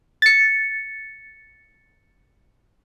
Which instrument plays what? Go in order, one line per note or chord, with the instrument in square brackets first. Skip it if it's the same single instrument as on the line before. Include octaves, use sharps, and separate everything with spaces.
[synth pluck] A6 C#7